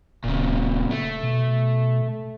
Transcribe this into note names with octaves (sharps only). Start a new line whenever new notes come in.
D1 A#2 C#3
A3
B2